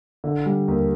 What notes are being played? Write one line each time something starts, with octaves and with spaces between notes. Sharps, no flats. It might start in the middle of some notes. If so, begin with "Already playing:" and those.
D3
G3
D#2